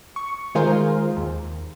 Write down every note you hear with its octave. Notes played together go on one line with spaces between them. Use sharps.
C#6
D#3 G#3 F4 G#4 A#4 C5
D#2